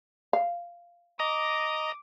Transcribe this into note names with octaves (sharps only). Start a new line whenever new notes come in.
F5
D#5 A#5 D6 D#6